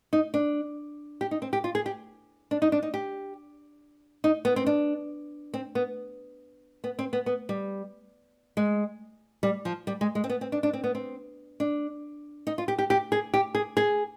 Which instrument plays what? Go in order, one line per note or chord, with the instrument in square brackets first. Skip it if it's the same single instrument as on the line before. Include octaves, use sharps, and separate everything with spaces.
[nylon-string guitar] D#4
D4
G4
D#4
C4
G4
F4
G#4
G4
D4
D#4
D4
D#4
G4
D#4
B3
C4
D4
C4
B3
B3
C4
B3
B3
G3
G#3
G3
F3
G3
G#3
G#3
C4
B3
C4
D4
D4
C4
B3
C4
D4
D#4
F4
G4
G4
G4
G#4
G4
G#4
G#4